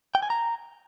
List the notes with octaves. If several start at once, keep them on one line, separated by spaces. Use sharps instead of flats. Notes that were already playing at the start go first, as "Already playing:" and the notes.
G5
G#5
A#5